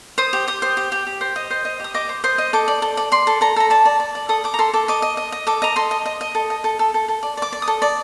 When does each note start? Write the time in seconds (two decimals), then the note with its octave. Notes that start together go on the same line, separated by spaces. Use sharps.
0.18 C5 D#6
0.33 G4
0.47 G4 D#6
0.62 C5
0.77 G4
0.92 G4
1.07 G4
1.21 C5
1.36 D#5
1.50 C5
1.65 D#5
1.80 G4 D#6
1.94 D#5 D6
2.09 C5
2.24 C5 D#6
2.38 D#5
2.53 A4 D6
2.68 D5
2.82 A4
2.97 D5
3.12 D5 C6
3.27 A4
3.41 A4 A#5
3.56 A4 A#5
3.70 D5 A5
3.85 D5
4.00 D5
4.15 D5
4.29 A4 D#6
4.44 A4 D6
4.54 A#5
4.59 A4 C6
4.74 A4 D6
4.88 D#5 D6
5.02 D#5
5.17 D#5
5.32 D#5
5.47 A4 D6
5.62 D#5 A#5
5.76 A4 C6
5.91 D#5
6.06 D#5
6.21 D#5
6.35 A4
6.50 D#5
6.64 A4
6.79 A4
6.94 A4
7.08 A4
7.23 D5
7.37 D5 D6
7.53 D5
7.62 D#6
7.68 A4
7.82 D5